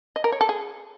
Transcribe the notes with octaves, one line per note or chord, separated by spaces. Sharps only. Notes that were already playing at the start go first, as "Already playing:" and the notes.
D#5
A#4
C#5
A4
G#4